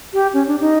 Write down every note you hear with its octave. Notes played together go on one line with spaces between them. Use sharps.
G4
C#4
D4
D#4